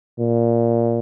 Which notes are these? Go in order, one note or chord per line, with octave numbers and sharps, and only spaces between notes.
A#2